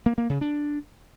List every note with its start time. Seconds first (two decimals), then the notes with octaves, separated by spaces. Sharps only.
0.06 A#3
0.18 A#3
0.30 C#3
0.41 D4